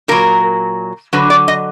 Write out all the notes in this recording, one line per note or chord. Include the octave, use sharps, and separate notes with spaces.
A#2 F#3 A#4
D3 F#3 B4
D5
D#5